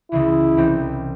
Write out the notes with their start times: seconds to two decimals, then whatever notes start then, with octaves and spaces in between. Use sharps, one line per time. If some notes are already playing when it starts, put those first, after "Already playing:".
0.11 C#2 C#3 E3 E4
0.57 C2 C3 E3 C4 D#4